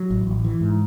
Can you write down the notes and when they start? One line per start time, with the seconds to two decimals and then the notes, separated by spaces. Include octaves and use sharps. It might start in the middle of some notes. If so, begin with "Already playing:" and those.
Already playing: F#3
0.10 A1
0.27 A1
0.44 E3
0.61 G#2